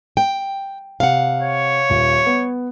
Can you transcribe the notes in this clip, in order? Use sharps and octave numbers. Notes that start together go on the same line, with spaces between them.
G5
C3 F5 F#5
C#5
D#1
B3